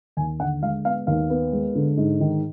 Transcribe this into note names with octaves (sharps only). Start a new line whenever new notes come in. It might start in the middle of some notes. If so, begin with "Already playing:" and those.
D#2 G#5
D3 F#5
G#3 F5
B3 F5
D#2 F5
B3
G#3
D3
G#2
D#3